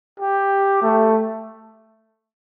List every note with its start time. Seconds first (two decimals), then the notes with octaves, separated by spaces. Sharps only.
0.20 G4
0.82 A3